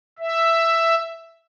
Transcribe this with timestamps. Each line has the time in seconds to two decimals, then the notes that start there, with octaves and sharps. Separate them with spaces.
0.19 E5